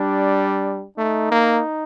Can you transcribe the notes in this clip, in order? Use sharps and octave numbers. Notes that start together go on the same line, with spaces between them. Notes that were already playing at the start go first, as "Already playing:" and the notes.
Already playing: G3 D4
A3 D#4
A#3